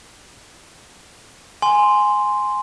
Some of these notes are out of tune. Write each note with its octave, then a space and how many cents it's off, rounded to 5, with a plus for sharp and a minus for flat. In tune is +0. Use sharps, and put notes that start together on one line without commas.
G#5 +0 C6 +0